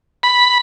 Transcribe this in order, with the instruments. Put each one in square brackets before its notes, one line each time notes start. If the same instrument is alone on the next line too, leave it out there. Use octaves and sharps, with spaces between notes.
[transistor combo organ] B5